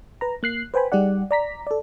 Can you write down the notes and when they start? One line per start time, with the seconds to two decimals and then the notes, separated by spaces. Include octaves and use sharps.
0.21 B4 A#5
0.43 A#3 F#6 C7
0.74 B4 C5 G5 G#5 B5
0.92 G3 D#4 G4 G#4 D5 F#5
1.31 D5 A#5 B6
1.67 A4 D5